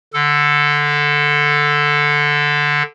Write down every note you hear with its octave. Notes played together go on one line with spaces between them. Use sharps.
D3 A4